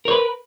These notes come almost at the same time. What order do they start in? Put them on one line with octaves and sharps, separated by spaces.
A#4 C#5 B4